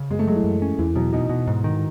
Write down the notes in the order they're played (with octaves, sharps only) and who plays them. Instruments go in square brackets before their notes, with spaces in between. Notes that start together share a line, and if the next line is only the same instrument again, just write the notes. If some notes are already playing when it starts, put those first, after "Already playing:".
Already playing: [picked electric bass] C#3
[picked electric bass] F#2 [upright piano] G#3
[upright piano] A3
[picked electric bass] F#3 [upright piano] G#3
[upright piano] E3
[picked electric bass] F#2
C#4
[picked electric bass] E2 [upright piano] E3
[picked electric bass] B2 [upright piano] F#3
[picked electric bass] B2 [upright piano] D#4
[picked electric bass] B2
G#2
D#3